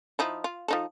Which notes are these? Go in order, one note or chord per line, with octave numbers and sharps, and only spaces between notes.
F3 D#4 E4
F4
F3 D#4 A4